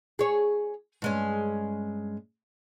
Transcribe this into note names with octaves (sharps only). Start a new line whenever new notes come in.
G#4 C#5
G2 G#3 C#4